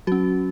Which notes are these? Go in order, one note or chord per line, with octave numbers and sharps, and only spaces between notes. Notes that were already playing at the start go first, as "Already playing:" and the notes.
F#3 C#4 F#4